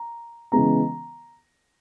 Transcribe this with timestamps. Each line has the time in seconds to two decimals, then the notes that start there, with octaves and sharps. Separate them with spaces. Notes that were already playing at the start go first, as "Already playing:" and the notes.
Already playing: A#5
0.52 C#3 E3 G#3 B3 A#5